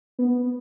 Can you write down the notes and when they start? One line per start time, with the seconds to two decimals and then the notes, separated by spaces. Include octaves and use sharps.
0.19 B3